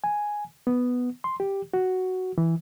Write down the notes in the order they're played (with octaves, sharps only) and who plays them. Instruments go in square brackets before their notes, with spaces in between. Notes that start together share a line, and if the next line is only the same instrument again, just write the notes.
[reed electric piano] G#5
B3
C6
G4
F#4
E3